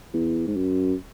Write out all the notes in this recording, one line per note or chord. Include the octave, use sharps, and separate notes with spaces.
E2
G#2
F#2